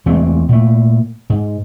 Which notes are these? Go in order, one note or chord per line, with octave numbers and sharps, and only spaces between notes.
E2 G#3 A3 C4
A#2 A3
G#2